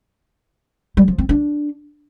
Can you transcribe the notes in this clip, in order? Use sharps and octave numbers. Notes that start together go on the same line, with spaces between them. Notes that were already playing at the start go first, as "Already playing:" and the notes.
G3
F3
C4
D4